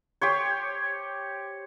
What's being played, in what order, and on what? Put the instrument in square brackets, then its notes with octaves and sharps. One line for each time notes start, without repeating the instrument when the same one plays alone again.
[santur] G4 C5 C#5